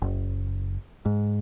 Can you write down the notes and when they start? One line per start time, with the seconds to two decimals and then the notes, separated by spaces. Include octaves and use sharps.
0.02 F#1
1.05 G#2